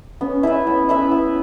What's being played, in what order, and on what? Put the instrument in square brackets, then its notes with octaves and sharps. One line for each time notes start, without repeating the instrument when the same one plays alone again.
[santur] B3 [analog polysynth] C#4
[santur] E4 B4 E5
B3
E4 B4 E5
B3